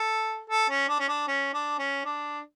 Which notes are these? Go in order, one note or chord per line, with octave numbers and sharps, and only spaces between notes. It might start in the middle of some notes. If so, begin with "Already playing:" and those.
Already playing: A4
A4
C#4
D4
C#4
D4
C#4
D4
C#4
D4